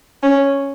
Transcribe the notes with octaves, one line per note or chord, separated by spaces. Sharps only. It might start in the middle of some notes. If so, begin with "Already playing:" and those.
C#4